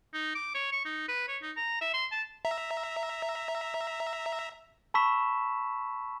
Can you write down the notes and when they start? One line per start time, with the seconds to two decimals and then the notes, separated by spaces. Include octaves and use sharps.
0.14 D#4
0.35 D6
0.55 C#5
0.72 C#6
0.85 D#4
1.09 B4
1.28 C#5
1.42 D#4
1.57 A#5
1.81 E5
1.94 C6
2.12 A5
2.45 E5 A#5
4.94 A5 B5 C#6 E6 B6 E7